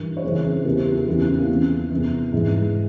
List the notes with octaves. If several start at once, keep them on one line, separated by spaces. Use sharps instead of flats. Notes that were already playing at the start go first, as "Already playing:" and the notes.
Already playing: G2 E3 A#4
C#5
F2 C#3 E3 G#4 C5
G#4 C5
E2 C#3 E3 G4 A#4
G4 A#4
F4 G#4
E2 C#3 E3 E4 G4
C#4 F4
C4 E4
A#3 C#4
E2 E3
E2 C3 E3
G#2 E3 G#3
G#3